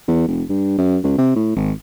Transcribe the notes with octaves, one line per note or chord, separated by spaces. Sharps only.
E2
F1
G2
F#2
C#2
C3
A2
G#1